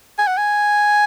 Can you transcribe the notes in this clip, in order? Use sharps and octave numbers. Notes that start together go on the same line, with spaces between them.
G#5
F#5
G#5